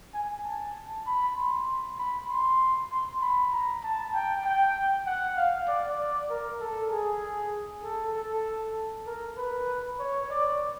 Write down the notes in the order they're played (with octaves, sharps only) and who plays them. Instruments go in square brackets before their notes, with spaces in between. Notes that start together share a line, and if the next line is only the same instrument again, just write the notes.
[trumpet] G#5
A5
B5
C6
B5
C6
C6
B5
A#5
A5
G5
G5
F#5
F5
D5
D5
A#4
A4
G#4
A4
A4
A#4
B4
C#5
D5